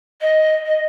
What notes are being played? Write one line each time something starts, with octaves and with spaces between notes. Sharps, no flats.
D#5
D#5